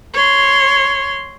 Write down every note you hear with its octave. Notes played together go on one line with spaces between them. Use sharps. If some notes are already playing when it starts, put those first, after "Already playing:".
C#5 C6